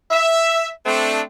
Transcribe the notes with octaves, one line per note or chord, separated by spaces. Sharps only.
E5
A3 C4 D4